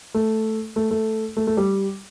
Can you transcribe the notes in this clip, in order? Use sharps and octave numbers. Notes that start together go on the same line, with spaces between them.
A3
A3
A3
A3
A3
G3